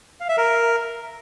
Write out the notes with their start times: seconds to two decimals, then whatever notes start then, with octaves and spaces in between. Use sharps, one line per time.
0.20 F5
0.29 E5
0.37 A#4